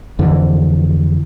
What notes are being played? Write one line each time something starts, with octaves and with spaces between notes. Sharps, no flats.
F2 D3 E3